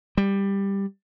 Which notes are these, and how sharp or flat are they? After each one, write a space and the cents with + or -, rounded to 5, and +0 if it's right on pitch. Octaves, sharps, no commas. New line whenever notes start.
G3 +10